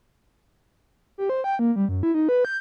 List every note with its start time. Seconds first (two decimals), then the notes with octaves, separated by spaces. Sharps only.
1.18 G4
1.29 C5
1.44 G5
1.59 A#3
1.76 G3
1.89 F#2
2.03 E4
2.14 D#4
2.29 B4
2.45 G6